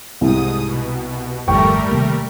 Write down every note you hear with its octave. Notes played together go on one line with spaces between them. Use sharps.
C2 G#2 D#6
B2
G#1 F2 D#3 G3 A3 A#4 G5 C#6
C3 D#3 A#3